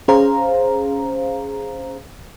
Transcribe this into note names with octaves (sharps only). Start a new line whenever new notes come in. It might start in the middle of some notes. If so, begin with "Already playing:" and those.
C#4 G#4 C5 F5 A#5